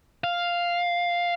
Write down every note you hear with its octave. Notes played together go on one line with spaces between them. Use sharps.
F5